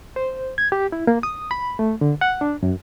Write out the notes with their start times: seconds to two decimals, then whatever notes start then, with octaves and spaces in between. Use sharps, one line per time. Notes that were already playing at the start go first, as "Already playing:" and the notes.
0.16 C5
0.58 G#6
0.72 G4
0.92 E4
1.07 A#3
1.23 D#6
1.51 B5
1.79 A3
2.01 D3
2.21 F#5
2.41 D4
2.63 F#2